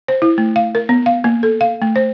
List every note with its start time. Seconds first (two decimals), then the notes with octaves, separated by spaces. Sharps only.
0.08 C5
0.22 E4
0.38 A3
0.56 F5
0.75 A#4
0.89 B3
1.06 F5
1.24 A#3
1.43 A4
1.61 F5
1.82 A3
1.96 C5